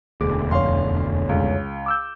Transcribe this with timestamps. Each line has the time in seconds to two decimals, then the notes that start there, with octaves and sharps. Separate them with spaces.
0.21 E1 D2 G#4 D6
0.51 F2 C#5 F5 C6
1.29 C#2
1.86 D6 E6 G6